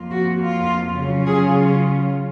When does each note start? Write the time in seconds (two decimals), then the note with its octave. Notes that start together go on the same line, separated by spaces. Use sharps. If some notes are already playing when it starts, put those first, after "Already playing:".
Already playing: F2 F3 A#3 F4
0.11 F#4
0.40 F4
0.97 C#3 F#3 C#4 F4
1.26 G#4